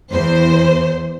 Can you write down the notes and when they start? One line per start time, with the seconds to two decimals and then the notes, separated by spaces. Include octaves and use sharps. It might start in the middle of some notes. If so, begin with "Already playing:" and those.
0.12 E2 C5